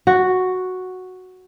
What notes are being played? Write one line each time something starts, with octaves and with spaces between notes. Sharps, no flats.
F#4